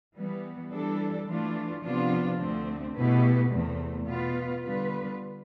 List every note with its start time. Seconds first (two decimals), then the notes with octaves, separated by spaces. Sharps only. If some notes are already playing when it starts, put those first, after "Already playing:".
0.16 E3 G3 B3
0.72 E3 G3 D4 A4
1.28 E3 A3 D4 F4
1.83 C3 F3 B3 D4 F4
2.39 D2 D3 A3 C4
2.95 B2 A3 E4 G4 B4
3.51 E2 C3 E3 A3
4.07 B2 B3 F4 B4
4.63 D3 G3 B3 F4 B4